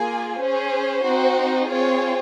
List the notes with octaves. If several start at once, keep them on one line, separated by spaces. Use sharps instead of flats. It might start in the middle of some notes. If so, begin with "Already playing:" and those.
Already playing: A#3 F4 G#4 G#5
C#4 G#4 C5
C4 D#4 F#4
C4 F4 G#4 C#5